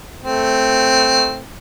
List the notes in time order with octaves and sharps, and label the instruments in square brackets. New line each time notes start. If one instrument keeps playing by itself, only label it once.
[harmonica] A3 C4